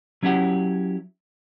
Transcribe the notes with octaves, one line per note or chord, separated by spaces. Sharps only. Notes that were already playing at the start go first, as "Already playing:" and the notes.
F#3 C#4 E4 G4 F#5